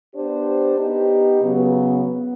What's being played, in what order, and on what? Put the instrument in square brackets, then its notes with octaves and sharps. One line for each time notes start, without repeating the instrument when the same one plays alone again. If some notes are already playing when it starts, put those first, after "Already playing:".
[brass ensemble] B3 D4 G4 C5
B3 D#4 G4
C#3 F#3 B3
B3